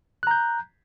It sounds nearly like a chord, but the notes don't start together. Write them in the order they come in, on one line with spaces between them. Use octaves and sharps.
F#6 A#5 G6